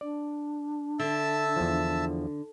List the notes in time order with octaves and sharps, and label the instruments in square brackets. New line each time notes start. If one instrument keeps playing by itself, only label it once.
[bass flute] D4 [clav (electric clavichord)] D5
[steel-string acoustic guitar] D3 [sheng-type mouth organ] E5 A5 E6
[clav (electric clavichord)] E2 F3